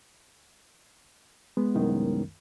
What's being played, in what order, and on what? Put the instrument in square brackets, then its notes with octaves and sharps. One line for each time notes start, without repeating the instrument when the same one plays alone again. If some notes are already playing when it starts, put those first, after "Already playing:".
[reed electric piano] G#3 B3
[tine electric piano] C2 F#2 D#3